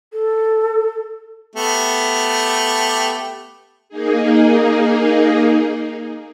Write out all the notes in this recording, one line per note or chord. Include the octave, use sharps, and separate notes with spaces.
A4
A3 B3 G4
A#3 D#4 G#4